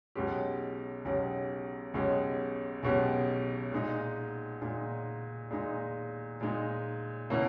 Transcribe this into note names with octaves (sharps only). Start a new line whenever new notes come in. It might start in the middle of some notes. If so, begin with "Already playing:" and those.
B1 B2 G#3 C#4 G4
B1 B2 G#3 C#4 G4
B1 B2 G#3 C#4 G4
B1 B2 G#3 C#4 G4
A#2 G#3 D#4
A#2 G#3 D#4
A#2 G#3 D#4
A#2 G#3 D#4
B2 A#3 C#4 E4